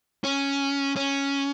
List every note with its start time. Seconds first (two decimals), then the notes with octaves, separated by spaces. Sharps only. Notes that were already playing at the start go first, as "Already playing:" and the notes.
0.24 C#4
0.96 C#4